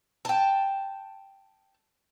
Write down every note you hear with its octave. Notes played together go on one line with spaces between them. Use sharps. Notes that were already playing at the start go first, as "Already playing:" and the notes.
G5 A5